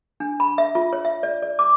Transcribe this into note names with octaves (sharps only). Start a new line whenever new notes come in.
D4
B5
E5
F4
C#5
E5
D5
D5
D6